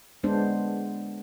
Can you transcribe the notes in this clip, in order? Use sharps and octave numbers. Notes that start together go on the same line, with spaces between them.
G#3 B3 D4 C5